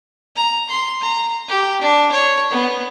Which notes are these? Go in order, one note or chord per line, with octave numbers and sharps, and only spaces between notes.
A#5
C6
A#5
G4
D4
C#5
B3